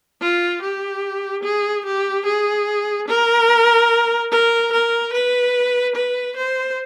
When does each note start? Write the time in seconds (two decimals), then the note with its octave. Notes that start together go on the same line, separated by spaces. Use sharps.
0.21 F4
0.62 G4
1.43 G#4
1.85 G4
2.26 G#4
3.08 A#4
4.31 A#4
4.72 A#4
5.13 B4
5.95 B4
6.36 C5